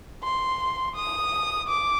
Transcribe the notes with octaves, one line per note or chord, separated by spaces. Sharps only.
C6
D#6
D6